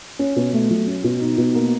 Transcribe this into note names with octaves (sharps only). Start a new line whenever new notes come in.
C#4
B2
A3
F#3
C#4
B2
D#4
B2
A#3